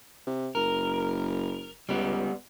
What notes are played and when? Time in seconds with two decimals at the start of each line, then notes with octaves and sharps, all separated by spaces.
0.27 C3
0.55 F#1 A#4
1.89 C#2 G3 B3